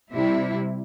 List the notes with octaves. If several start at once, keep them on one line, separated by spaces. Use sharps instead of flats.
C3 G3 E4